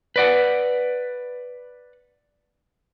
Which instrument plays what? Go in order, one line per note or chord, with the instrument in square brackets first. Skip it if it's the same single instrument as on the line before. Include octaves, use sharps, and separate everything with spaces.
[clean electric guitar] B4 D5 F#5